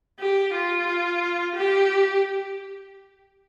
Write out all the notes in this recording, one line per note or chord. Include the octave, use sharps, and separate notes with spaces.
G4
F4
G4